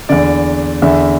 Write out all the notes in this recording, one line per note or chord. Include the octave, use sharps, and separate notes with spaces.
E2 D3 D5
E2 D3 E5